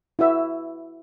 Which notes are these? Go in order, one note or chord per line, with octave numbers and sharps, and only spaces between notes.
E4 F#4 B4 E5